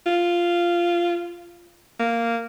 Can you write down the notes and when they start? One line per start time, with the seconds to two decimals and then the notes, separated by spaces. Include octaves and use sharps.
0.06 F4
2.00 A#3